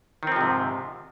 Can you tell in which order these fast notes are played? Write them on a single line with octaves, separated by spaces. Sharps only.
D#3 C4 F3 C3 G#2